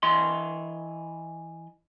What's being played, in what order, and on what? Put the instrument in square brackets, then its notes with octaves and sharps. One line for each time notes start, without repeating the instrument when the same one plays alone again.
[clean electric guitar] E3 D#5 C6